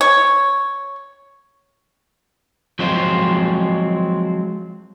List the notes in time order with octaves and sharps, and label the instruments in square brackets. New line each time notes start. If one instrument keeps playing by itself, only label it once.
[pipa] C#5
[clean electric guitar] F3 F#3 G#3 C4 F4 C5